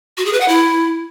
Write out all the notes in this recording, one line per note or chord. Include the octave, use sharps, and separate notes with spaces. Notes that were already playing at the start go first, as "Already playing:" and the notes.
F#4
G#4
B4
F#5
E4